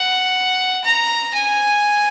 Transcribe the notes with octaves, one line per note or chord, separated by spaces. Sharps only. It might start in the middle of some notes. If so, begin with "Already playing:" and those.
Already playing: F#5
A#5
G#5